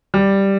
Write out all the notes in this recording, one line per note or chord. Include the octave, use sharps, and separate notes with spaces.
G3